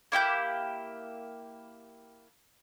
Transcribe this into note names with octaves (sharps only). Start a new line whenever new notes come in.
A#3 E4 G4 G6